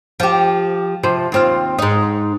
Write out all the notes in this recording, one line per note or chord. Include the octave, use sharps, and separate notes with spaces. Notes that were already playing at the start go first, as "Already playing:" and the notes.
F3 G4
C3 F3 C5
D#2 C4 F4
G#2 D#4